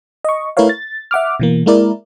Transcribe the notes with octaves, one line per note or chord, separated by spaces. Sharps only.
D#5 C#6
A3 E4 A#4 B4 C#5 F5
A6
E5 F#5 D6 F6
B2 E3 A#3
G#3 A#3 E4 A#4 D5